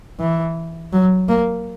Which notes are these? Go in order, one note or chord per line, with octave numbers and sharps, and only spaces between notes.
E3
F#3
A#3